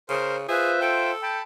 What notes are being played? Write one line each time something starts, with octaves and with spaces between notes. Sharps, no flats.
C#3 A#4 C5 C6
F4 G#4 B4 C5 E5
A4 G5
G5 A5 B5